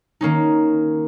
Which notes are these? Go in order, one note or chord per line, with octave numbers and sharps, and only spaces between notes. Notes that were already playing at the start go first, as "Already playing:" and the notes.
D#3 A#3 C#4 D#4